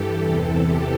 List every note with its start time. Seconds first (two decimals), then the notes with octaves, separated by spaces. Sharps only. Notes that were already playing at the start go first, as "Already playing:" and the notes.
Already playing: G2 E3 G4 A4
0.24 E2 C3 E3 A4
0.67 G4